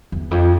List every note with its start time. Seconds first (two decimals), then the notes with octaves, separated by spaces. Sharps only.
0.12 E2
0.31 F2